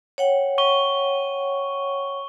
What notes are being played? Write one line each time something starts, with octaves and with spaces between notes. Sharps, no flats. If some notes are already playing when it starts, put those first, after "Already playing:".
C#5 F#5 G5
C#6 G7